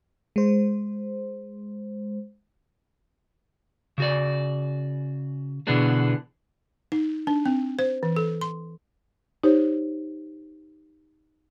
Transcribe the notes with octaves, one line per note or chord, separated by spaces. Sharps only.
G#3 C5
C#3 F#4 D5
B2 D3 E3 B3 D4 G#4
D#4
D4
C4
C5
E3
A4
C6
D#4 G4 C5 C#5